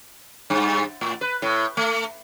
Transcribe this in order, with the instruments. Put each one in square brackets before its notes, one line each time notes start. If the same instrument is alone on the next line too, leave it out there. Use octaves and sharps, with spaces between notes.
[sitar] G2
A2
B4
A2
A3